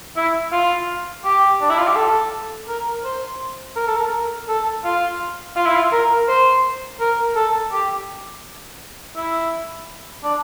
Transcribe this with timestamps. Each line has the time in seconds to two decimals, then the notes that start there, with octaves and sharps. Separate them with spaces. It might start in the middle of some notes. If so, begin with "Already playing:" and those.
0.17 E4
0.52 F4
1.25 G4
1.61 D4
1.70 E4
1.78 F4
1.87 G4
1.96 A4
2.68 A#4
3.04 C5
3.76 A#4
3.87 A4
3.97 A#4
4.48 A4
4.84 F4
5.56 F4
5.66 E4
5.76 F4
5.92 A#4
6.28 C5
7.00 A#4
7.36 A4
7.72 G4
9.16 E4
10.23 D4